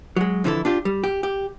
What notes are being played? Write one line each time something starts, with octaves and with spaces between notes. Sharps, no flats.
F#3 G#3
F2 D3 E3 D#4 E4 A4
D4 F4 G4
G3
G4
G4